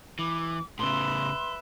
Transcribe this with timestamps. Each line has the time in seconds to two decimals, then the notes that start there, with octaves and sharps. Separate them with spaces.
0.19 E3 D6
0.79 A2 C#3 B4 E5 C6